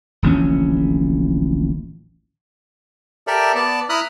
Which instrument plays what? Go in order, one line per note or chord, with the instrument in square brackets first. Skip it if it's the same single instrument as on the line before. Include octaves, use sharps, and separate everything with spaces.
[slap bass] D1 A#1 E3 C#4
[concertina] G4 A4 A#4 D5 E5
B3 D5 A5
E4 A#5 B5 D#6 F6 F#6